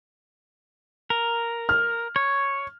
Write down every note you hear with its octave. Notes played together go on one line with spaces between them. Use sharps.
A#4
F6
C#5